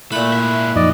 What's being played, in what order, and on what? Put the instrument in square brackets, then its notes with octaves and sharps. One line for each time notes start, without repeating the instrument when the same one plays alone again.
[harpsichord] A#2 B5 [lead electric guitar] A3 [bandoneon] E4 F#6
[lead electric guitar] G#2 E5
[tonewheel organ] F#2 F3 D#4 [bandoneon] D5 D#5